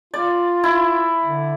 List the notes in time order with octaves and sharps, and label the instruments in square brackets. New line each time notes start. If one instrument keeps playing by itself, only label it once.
[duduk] F4 [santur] D5
[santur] E4
[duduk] D3